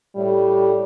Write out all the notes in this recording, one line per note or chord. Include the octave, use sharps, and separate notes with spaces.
A2 G3